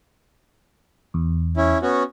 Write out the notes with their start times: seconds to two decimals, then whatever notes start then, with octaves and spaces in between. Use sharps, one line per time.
1.14 E2
1.57 C#4 E4
1.82 B3 C#4 F#4